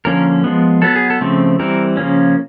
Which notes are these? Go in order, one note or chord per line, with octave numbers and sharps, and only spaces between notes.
D3 F3 A#3 C#4 A#4
F3 G#3 B3
F#3 B3 A4
G#4
A4
C#3 F3 A3 C4
E3 G3 C4 A#4
C#3 F3 A#3 C#4